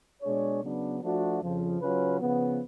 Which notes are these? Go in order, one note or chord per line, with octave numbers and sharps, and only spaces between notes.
B2 G#3 D4 G#4 C#5
C#3 F#3 B3 D4
F3 A3 D4 F#4
F2 C#3 F3
C#3 F#3 C#4 F4 B4
C#3 F3 B3